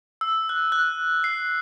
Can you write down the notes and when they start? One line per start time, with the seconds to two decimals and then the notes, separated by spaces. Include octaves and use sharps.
0.21 E6
0.49 F#6
0.72 F#6
1.24 C7